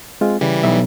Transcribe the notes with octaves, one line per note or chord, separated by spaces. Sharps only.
G#3 C4 F4
C#3 E3 G3
B1 E5